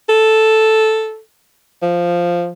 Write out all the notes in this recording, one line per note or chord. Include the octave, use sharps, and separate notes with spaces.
A4
F3